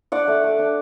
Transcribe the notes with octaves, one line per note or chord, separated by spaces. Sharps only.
D4 D5 F#5
A3
A3
D4